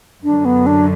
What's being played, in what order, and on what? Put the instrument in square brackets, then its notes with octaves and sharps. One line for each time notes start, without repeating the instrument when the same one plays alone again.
[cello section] F#2 D3 F#3 [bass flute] D4
[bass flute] B3
D4